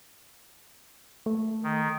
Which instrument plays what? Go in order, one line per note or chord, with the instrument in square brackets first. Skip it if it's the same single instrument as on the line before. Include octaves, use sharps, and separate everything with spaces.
[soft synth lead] A3
[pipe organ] D#3